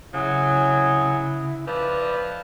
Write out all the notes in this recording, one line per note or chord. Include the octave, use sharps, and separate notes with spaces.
C#3 F#3 E4 G#4
F3 B4 D5 E5